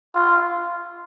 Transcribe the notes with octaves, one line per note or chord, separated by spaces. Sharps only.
F4